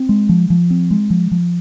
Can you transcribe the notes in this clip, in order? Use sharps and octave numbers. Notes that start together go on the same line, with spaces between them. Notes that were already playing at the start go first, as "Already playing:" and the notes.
Already playing: C4
G#3
F3
F3
C4
G#3
F3
F3